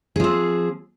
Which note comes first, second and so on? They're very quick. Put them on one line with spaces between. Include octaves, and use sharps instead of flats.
G#4 F3 C4